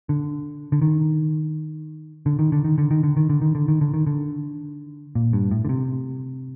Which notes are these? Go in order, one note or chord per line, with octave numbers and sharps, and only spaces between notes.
D3
D3
D#3
D3
D#3
D3
D#3
D3
D#3
D3
D#3
D3
D#3
D3
D#3
D3
D#3
D3
A#2
G2
A2
D3
C3